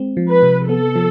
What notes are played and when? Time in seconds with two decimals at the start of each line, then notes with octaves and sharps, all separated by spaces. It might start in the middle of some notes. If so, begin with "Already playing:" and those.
Already playing: G#3 C4
0.17 F3
0.31 B4
0.43 C3
0.69 B3 A4
0.96 F3